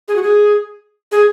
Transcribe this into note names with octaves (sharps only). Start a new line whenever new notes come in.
G#4
F#4
G#4
G#4